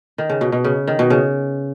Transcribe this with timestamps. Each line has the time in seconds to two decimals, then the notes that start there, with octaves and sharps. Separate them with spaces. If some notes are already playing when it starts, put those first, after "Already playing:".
0.18 D#3
0.29 C#3
0.41 B2
0.52 B2
0.64 C#3
0.88 D#3
0.99 B2
1.10 C#3